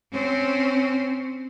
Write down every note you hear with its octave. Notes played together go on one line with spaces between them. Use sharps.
C4 C#4